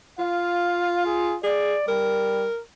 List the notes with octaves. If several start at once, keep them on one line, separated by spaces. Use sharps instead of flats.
F4 F5
G#4
G#4 D5
G3 A#4